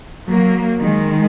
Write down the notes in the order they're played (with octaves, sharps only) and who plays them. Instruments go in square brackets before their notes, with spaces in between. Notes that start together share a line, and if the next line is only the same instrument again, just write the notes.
[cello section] F#3 A#3
D#3 G#3